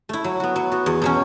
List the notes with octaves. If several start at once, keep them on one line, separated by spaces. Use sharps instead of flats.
A3 E4
F#3
B3 F#4
F#3
B3 F#4
E2
B2 F#3 C#4